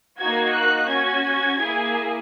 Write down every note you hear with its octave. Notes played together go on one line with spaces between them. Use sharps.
A#3 D#4 F#4 G#6
F#6
C#4 F#4 G#6
A#3 E4 G#4